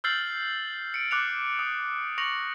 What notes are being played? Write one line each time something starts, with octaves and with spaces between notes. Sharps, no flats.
E6 F6 G6 A6 C7 F#7
C#7 D7
D6 F#6 C#7 F7
D#6
C#6 A#6 C#7 F7 F#7